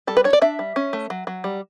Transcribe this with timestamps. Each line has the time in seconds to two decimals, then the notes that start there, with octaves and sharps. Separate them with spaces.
0.07 G3 A4
0.17 B4
0.24 D4 C#5
0.33 D5
0.42 D4 E5
0.59 G3
0.76 C#4
0.93 A3
1.10 F#3
1.27 F#3
1.44 G3